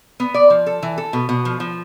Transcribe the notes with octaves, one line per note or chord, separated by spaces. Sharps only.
B3
D5
F3
A4
E3
A4
B2
B2
F3
F3